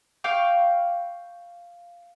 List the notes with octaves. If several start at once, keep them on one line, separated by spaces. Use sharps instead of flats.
F5 G5 C#6 D6